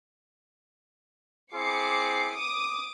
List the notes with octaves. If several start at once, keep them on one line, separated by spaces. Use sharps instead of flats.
C4 E4 G#4 D6 C7 C#7
D6 D#6